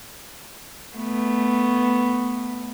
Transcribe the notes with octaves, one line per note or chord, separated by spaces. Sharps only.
A3 B3